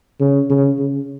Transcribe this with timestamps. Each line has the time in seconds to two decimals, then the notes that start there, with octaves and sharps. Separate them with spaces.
0.20 C#3
0.50 C#3
0.79 C#3